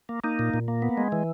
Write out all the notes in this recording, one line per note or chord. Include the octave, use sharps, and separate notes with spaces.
A#3
A#3 D#4
A#2
A#2
A#3
B3
G#3
E3